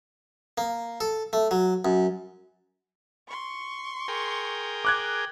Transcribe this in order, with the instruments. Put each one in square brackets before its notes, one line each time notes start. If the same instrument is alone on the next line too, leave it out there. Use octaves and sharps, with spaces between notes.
[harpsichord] A#3
A4
A3
F#3
F#2
[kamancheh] C6 C#6
[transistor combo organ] G#4 A#4 G5
[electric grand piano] D6 F#6 G#6